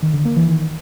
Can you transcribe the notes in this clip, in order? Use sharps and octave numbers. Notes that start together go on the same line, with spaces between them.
D#3
D3
A#3
E3
D#3